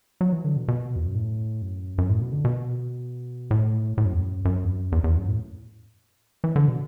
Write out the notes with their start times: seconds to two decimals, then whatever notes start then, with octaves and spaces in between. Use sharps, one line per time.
0.21 F#3
0.32 E3
0.44 D3
0.56 B2
0.68 B2
0.96 E2
1.05 F#2
1.15 A2
1.62 F#2
1.98 F#2
2.09 A2
2.21 B2
2.32 D3
2.45 B2
3.51 A2
3.98 A2
4.05 F#2
4.12 E2
4.20 F#2
4.45 F#2
4.64 E2
4.68 F#2
4.92 E2
5.04 E2
5.16 F#2
5.28 A2
6.44 E3
6.56 D3
6.68 B2